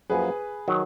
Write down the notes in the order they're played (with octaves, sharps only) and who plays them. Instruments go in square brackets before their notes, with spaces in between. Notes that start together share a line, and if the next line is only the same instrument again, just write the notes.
[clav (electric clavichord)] F#2 F3 A#3 [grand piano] G#4 B4
[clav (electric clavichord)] D#3 F#3